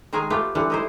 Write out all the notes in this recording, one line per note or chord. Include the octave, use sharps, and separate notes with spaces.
D#3 G#3 G#4 A#4 G#5
A3 B3 F4 G4
D3 E3 G3 F#5
D#4 E4 C5